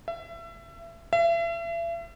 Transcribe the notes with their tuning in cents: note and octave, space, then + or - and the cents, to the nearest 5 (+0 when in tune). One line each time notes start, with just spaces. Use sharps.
E5 +30
E5 +40